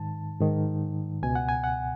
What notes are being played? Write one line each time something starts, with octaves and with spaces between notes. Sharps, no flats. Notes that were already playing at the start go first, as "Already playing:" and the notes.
Already playing: G#2 D#3 A5
G#2 D#3
C#2 B2 G#5
F#5
G#5
F#5